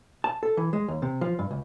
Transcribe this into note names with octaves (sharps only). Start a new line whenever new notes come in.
A5
A4
E3
G#3
D#2
C3
F3
G2
C#2